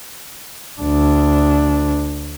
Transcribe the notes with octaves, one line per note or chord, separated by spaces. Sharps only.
D2 D4